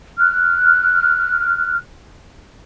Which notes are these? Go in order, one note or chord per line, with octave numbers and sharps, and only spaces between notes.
F6 F#6